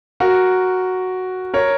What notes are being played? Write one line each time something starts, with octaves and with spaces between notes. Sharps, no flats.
F#4 A#4
A#4 C#5